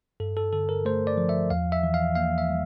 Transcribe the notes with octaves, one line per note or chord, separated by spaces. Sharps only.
G2 A4
A4
D3 A4
A#4
A3 C5
D5
F3
E5
E2 F5
E5
E3
F5
A#3 F5
E5
G3